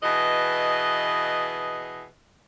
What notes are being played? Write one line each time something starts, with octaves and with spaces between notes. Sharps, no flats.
B2 E3 G#4 D#5